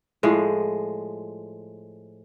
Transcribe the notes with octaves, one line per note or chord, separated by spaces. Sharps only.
A2 F3 G#3